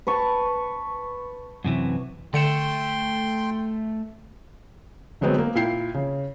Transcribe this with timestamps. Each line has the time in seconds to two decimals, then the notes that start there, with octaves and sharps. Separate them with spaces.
0.07 B4 A5 C#6
1.64 F#2 C3 E3
2.34 D3 A3 G5 C6 C#7 E7
5.21 D3 F#3 G#3 B3 C4
5.38 A#3
5.55 A#2 E4 G5 C7
5.94 C#3